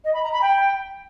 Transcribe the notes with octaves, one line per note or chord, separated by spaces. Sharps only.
D#5
B5
A#5
B5
G5